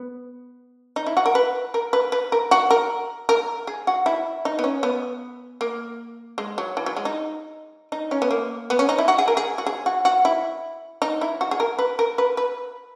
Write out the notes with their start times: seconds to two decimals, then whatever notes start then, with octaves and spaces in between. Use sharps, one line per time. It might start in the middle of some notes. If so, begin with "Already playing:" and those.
Already playing: B3
0.96 D#4
1.06 E4
1.17 F#4
1.26 A#4
1.35 B4
1.74 A#4
1.93 B4
2.12 B4
2.32 A#4
2.51 F#4
2.71 A#4
3.29 A#4
3.67 G#4
3.87 F#4
4.06 E4
4.45 D#4
4.59 B3
4.64 C#4
4.83 B3
5.61 A#3
6.38 G#3
6.58 F#3
6.77 E3
6.86 F#3
6.96 G#3
7.05 D#4
7.92 D#4
8.11 C#4
8.22 B3
8.31 A#3
8.70 B3
8.79 C#4
8.89 D#4
8.99 E4
9.08 F#4
9.18 G#4
9.28 A#4
9.37 G#4
9.58 F#4
9.66 G#4
9.86 F#4
10.05 F#4
10.25 E4
11.02 D#4
11.21 E4
11.41 F#4
11.51 G#4
11.60 A#4
11.79 B4
11.99 A#4
12.18 B4
12.37 B4